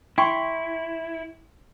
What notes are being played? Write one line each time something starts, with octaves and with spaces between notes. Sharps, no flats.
E4 G5 C6 C#6